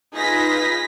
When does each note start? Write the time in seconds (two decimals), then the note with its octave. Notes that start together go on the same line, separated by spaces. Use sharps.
0.14 D#4 F4 G#4 B4 A#6 B6